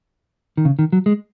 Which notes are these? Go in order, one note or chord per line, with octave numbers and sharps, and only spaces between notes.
D#3
C#3
D#3
F#3
G#3